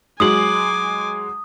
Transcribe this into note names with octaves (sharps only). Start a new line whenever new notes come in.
F#3 G#3 G#5 D6 D#6 F#7